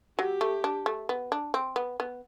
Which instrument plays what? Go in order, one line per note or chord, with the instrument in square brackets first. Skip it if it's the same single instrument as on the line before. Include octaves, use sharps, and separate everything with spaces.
[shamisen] F#3 [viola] G4
[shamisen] A3
D4
A3
B3
D4
C4
B3
B3